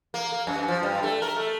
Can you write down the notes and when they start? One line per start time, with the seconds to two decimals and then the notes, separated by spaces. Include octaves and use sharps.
0.14 A#3
0.32 A#3
0.47 F#2
0.68 F3
0.83 G2
1.03 A3
1.22 A#4
1.37 A3